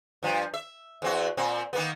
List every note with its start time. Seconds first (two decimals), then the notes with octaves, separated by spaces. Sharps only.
0.23 G2 F3
0.54 E5
1.02 E2 C4 F#4
1.37 A#2 C4
1.73 D#3 A#3 B3